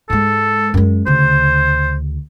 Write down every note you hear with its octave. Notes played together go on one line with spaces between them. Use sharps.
G#2 G#3 A4
F#2 G#3
D2 C#3 C5